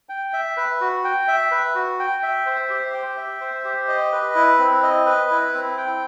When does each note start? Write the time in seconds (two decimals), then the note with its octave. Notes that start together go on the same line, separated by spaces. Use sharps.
0.09 G5
0.33 E5
0.57 B4
0.81 F#4
1.04 G5
1.28 E5
1.51 B4
1.75 F#4
1.99 G5
2.23 E5
2.46 C5
2.69 G4
2.94 G5
3.17 E5
3.41 C5
3.65 G4
3.88 D#5
4.12 B4
4.35 E4
4.59 C4
4.83 D#5
5.06 B4
5.30 E4
5.54 C4
5.78 G5